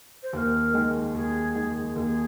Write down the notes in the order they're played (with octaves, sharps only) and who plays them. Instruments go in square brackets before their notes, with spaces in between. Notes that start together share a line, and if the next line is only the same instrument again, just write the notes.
[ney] C5
[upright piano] D#2 [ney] C5
[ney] A#4
[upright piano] D#3 G#3
[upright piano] D#2 [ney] G#4
[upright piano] D#3 G#3
[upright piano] D#2 [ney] G#4 A#4